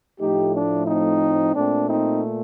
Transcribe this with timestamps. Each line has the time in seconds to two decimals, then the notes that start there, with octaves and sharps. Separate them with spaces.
0.20 A2 F3 A3 D#4 G4
0.54 D4
0.87 C4 D#4
1.54 A#2 A3 C4 D4
1.88 C4 D#4